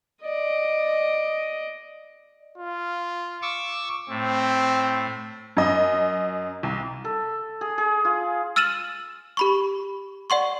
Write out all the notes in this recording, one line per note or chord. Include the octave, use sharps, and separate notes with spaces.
D5 D#5
F4
C#6 D6 E6
A2 C4
F#2 D#5
C2
A4
G#4
G#4
F4
E6 F6 A6 D#7 E7 F#7
G4 B5 C#6
D5 F#5 C6 C#6